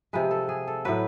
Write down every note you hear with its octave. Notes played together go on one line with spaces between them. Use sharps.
C3 F3 G#3 B4
A4
G#4
A4
A2 F#3 B4